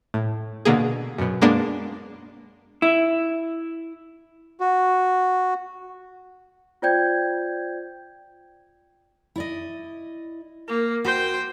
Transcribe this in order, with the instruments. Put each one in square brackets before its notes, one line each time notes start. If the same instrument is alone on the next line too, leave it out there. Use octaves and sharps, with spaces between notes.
[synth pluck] A2
B2 D3 A#3 G#4
F#2 B2
G#3 A#3 B3 D4
[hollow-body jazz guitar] E4
[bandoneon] F#4
[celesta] F4 C5 D5 G5 G6 G#6
[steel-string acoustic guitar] E4 D5 D#5
[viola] A#3
[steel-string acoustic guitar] F#4 [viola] C5 G5